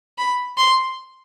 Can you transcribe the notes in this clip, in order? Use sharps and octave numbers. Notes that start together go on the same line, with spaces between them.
B5
C6